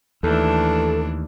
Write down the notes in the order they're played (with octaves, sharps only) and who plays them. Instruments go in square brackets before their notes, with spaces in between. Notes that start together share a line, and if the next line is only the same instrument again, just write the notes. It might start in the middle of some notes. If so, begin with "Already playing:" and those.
[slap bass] D#2 [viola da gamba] E3 A3 D4 [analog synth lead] A4